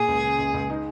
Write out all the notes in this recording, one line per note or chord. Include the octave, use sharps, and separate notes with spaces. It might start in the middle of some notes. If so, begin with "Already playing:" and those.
Already playing: A#2 G#4
C#2
C#3
C#2
C#2
D#4